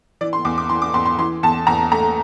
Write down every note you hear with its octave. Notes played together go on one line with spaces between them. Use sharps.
E3 D5
C6
E2 D6
D6
E3 C6
D6
E2 C6
C6
E3 C6
E2 A5
E2 A#5
A3 A#5